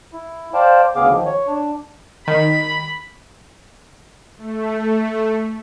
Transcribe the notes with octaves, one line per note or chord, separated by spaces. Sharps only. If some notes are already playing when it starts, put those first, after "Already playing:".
E4
C5 D5 F5 G5 A5
D2 C#3 B3 G#4 F5 D6
D#3 F3
C#5
D4
D#3 B5
A3